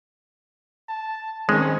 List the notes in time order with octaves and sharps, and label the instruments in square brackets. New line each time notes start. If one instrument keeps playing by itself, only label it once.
[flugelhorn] A5
[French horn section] D#3 C4 C#4 [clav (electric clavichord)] G#3 [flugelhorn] C#5